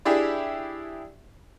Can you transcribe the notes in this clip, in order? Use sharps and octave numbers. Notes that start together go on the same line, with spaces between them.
D4 E4 G4 G#4